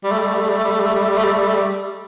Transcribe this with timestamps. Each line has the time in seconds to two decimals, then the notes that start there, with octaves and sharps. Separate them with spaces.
0.04 G3
0.11 A3
0.19 G3
0.27 A3
0.35 G3
0.41 A3
0.49 G3
0.57 A3
0.64 G3
0.71 A3
0.80 G3
0.86 A3
0.95 G3
1.03 A3
1.09 G3
1.18 A3
1.24 G3
1.32 A3
1.39 G3
1.48 A3
1.55 G3